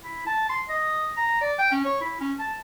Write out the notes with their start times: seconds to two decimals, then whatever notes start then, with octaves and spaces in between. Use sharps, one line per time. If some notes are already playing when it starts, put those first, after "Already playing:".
0.02 E4
0.27 A5
0.49 C6
0.69 D#5
1.17 A#5
1.41 D5
1.59 G5
1.72 C#4
1.85 C#5
2.01 E4
2.20 C#4
2.39 A5